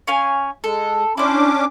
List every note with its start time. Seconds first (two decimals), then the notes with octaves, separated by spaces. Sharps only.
0.07 C#4 F5 G#5
0.64 G#3 A4
1.17 C#4 D4 E4 C5 D6